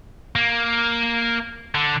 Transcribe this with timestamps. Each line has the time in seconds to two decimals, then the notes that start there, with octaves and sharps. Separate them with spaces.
0.36 A#3
1.75 D3